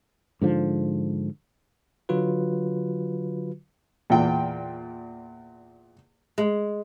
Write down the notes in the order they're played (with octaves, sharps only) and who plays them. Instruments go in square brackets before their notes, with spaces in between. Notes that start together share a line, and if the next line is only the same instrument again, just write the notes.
[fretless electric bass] G#2 D3 F3
[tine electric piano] D3 F#3 F4 F#4 B4
[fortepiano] E2 A#2 G5
[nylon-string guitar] G#3